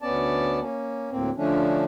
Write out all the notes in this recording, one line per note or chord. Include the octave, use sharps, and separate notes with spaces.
D2 B3 C#4 D5 A5
A#3 C#4
D2 A2 A#3 C4
D3 F3 A3 C#4 D4